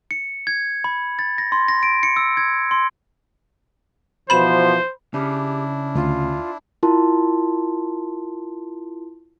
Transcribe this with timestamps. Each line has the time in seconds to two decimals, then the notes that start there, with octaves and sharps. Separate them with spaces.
0.11 C#7
0.47 G#6
0.84 B5
1.19 A6
1.38 A#6
1.52 C6
1.68 A#6
1.83 D7
2.03 C#7
2.16 E6
2.37 G#6
2.71 C6
4.30 B2 E3 F3 C5 B5 E7
5.14 C#3 D4 E4 G4
5.95 D2 F4
6.83 E4 F4 A#4 A5 C6